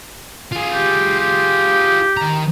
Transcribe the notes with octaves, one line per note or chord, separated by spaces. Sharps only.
F4 G#4
G4
G4
D#3 A#5